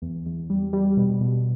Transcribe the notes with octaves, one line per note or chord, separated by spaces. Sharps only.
E2
E2
G3
G3
B2
B2